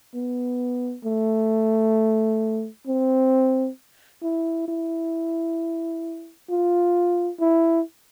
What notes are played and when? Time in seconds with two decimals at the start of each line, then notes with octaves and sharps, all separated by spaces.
0.14 B3
1.05 A3
2.87 C4
4.23 E4
4.68 E4
6.50 F4
7.40 E4